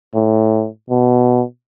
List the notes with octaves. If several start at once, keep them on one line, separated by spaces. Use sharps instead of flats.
A2
B2